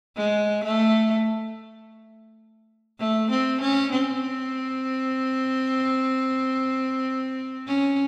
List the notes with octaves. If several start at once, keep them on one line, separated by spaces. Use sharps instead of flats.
G#3
A3
A3
C4
C#4
C4
C#4